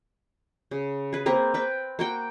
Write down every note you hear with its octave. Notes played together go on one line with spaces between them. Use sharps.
C#3
G#4 B4
A#3 C4 A#4 B4
C4 B4 G5
A#3 F#4 G5